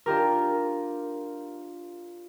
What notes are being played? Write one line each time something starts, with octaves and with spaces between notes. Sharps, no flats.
D4 F4 G4 A#4